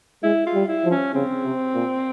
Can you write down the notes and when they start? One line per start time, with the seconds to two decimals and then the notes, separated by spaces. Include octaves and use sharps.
0.23 G#3 E4
0.46 F4
0.54 G3
0.69 E4
0.84 F3
0.91 C#4
1.14 C#3 C4
1.44 C3
1.74 A#2